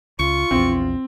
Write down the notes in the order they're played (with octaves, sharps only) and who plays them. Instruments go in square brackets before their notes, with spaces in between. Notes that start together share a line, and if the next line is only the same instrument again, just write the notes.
[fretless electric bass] C#2 [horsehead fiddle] F4 [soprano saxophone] C#6
[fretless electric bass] A#1 E2 [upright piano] C4